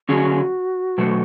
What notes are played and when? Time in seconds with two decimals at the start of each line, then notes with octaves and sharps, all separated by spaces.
0.09 D3 F#3 C#4 F#4 G#4
0.98 B2 F#3 A3